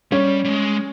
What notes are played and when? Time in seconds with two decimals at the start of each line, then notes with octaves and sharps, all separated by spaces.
0.11 G3 C#4 C#5
0.45 G3
0.49 G#3